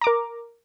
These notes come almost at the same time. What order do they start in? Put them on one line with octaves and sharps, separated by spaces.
A#5 D6 A#4